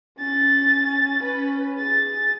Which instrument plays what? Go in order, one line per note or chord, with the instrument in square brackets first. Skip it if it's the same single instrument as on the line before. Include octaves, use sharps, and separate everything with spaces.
[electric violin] C#4 A6
C#4 B4
G#4 A6